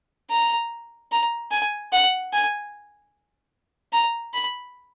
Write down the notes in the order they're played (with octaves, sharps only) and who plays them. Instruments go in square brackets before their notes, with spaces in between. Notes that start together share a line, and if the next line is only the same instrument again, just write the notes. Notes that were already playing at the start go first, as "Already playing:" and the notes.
[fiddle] A#5
A#5
G#5
F#5
G#5
A#5
B5